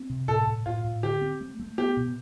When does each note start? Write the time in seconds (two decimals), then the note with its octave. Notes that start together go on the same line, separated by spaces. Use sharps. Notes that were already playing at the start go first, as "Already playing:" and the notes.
Already playing: C4
0.10 C3
0.28 A2 A4
0.47 A2
0.66 A2 F4
0.84 A2
1.03 D3 G4
1.21 C4
1.41 A3
1.60 A3
1.78 B3 G4
1.97 B2